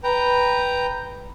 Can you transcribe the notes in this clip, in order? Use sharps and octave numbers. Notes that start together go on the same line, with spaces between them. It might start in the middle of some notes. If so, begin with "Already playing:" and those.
B4 G5 A#5